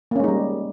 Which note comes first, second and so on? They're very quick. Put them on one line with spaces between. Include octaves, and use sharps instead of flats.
A#3 C#4 G#3 D#4 G3